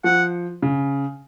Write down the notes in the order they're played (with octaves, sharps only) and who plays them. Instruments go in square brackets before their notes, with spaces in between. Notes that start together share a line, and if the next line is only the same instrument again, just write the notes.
[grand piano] F3 [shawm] F#5
[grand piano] C#3